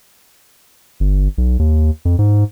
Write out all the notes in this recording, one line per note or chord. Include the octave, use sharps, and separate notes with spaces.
G1
B1
D#2
F2
G#2